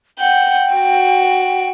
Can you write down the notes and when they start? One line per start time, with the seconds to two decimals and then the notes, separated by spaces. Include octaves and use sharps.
0.19 F#5 G5 G6
0.75 F#4 D7